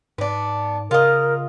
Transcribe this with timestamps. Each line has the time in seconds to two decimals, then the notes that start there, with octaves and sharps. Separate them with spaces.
0.18 G#2 B3 D4
0.91 C#3 F4 A#4 D#5